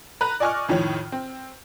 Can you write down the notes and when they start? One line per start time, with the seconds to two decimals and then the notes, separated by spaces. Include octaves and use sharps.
0.21 B4 A#5 F#6
0.40 D5 D#5 G#5 C#6 D6 F6
0.69 F2 A2 D#3 C#5
1.12 C4